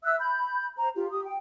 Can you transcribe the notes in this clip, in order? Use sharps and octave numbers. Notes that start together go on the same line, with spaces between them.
E5 E6 F#6
B5 G6
C5 A#5
F4 G4
G4 D#6
G5